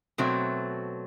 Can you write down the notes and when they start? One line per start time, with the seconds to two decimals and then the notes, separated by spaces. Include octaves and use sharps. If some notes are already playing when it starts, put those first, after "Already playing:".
0.18 B2 F#3 A3 C4